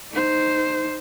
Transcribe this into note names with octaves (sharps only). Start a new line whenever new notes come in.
D#4 C5